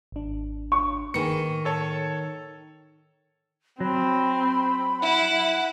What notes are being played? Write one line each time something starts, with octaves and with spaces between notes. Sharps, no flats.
G#1 D4
C#6
D#3 A#3 G#4 B4 C#7
A2
A4 C#5 A5
F#3 C4 B5
E4 F#5